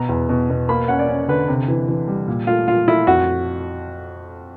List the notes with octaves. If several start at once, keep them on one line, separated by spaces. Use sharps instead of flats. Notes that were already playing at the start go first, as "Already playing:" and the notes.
Already playing: B2 A#5
E2
B2
B2
A#3 B5
C#4 F#5
D5
C#4
D3 B4
C3
E3
E3
G3
A#2
A3 F4
A#2 F4
A3 E4
F2 F#4